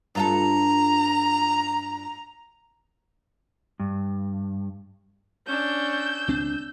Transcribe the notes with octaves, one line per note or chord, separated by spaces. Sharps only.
G2 F4 A4 A#5
G2
C#4 D4 E6 G6
C#2 C4 D4